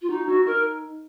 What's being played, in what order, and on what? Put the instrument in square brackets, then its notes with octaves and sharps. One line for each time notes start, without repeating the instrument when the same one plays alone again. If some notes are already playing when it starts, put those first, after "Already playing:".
[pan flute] F4
[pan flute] D#4 [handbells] F#4
[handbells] D#4 [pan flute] F#4
[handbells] D#4 [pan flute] A#4